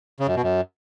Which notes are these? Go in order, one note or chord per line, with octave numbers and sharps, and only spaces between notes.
C#3
F#2
B2
F#2